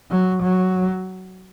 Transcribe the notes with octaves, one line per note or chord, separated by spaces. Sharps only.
F#3
F#3